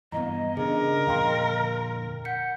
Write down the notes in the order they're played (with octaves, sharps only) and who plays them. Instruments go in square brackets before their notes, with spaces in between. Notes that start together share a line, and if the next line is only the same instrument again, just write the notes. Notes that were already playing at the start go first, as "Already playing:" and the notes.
[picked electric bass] G2 E3 [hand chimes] B3 A#5 [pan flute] D#5
[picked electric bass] C#3 [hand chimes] D4 G#4 [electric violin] A#4
[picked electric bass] F2 A#2 D3 [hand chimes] F5 G5 C6
[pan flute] F#5 [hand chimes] G6 B6 C#7